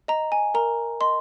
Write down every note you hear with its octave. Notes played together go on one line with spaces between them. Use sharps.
D#5 A#5
G#5
A#4 A#5
D#5 C6